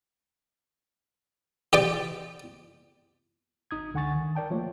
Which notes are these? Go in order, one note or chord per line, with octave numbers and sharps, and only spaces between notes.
G4 D5 D6
G#1 D#4 D#6 G#6
C#2 D3 F#5 G#5 C#6 A6
D#3
A#4 D5 G5 A5
F3 A3 A#3 F4 C#5